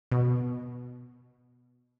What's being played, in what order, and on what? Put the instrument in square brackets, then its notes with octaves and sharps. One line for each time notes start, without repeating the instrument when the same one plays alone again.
[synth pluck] B2